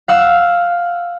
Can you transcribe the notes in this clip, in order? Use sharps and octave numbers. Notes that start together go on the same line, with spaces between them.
F5 F#5 E6